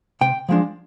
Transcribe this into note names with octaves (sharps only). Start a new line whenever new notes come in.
C3 G5
F3 G#3 D4